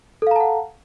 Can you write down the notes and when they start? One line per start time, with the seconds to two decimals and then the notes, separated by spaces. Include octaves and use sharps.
0.22 A4
0.27 F5
0.31 A#5
0.36 A5
0.40 F#5